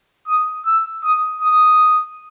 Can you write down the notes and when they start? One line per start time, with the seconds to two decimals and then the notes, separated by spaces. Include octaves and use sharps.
0.28 D#6
0.66 E6
1.04 D#6
1.42 D#6